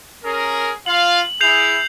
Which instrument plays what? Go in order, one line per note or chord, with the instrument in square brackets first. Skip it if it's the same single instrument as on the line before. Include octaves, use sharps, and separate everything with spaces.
[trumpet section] C#4 G#4 A#4
[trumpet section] F4 F5 [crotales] F#7
[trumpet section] E4 G#4 [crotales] G6 C7 F7